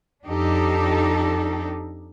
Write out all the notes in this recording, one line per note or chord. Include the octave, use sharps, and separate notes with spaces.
F2 D4 D#4 G4 A4